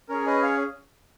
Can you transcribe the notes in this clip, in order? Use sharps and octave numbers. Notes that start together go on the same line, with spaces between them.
C#4 G#4 A#4 C#5
B4 D#5
C#5 F5